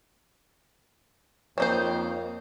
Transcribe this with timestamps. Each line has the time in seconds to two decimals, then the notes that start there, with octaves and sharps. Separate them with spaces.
1.58 F2 A#3 C4 D#4 C5 C#5